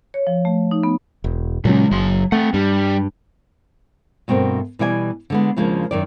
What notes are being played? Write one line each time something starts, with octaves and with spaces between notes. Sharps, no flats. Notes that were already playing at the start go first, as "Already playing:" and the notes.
C#5
F3
A3
D#4
B3
E1
A#2 C#3 F#3 G#3 C#4
F#1 F#3 C6
A3 C4 F#5
G2 G3
G2 B2 A3 C4 A#4
B2 E3 G3 D5 E5 G#5
D3 G#3 B3
D#2 C#3 F3 G#3 A#3 D4
F#2 D#3 D5